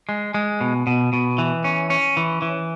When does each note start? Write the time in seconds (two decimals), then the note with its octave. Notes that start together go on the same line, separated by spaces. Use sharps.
0.09 G#3
0.34 G#3
0.61 B2
0.87 B2
1.13 B2
1.38 E3
1.64 C#4
1.90 C#4
2.17 E3
2.42 E3